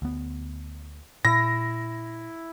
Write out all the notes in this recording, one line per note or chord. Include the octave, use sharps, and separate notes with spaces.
D2 B3
A#2 E4 A#6